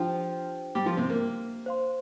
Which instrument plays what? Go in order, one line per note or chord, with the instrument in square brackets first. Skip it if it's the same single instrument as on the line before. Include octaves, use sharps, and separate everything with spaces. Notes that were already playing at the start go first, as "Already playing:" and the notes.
Already playing: [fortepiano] F3 F4 [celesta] D4 G4 C5 G5
[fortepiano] G3 G4
F3 F4
C3 C4
A#3
[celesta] C5 F5 C6